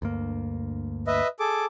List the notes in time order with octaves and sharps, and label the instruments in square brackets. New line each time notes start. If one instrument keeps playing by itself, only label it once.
[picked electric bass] D2 G2 A#3
[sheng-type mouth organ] B4 D#5 E5
G#4 A4 D6